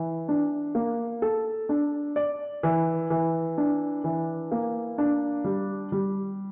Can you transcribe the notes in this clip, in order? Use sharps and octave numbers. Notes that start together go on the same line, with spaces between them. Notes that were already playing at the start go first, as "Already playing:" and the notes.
Already playing: E3
D4
A#3
A4
D4
D5
E3
E3
D4
E3
A#3
D4
G3
G3